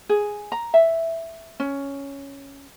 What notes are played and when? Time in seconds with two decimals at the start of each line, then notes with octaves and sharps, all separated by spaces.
0.09 G#4
0.52 A#5
0.74 E5
1.60 C#4